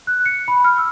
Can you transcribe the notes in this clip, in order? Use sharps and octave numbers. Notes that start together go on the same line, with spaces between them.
F#6
C#7
B5
F6
E6